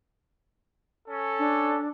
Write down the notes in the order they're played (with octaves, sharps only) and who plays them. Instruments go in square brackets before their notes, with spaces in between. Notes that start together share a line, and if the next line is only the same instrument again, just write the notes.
[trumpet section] C#4 A4
[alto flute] D4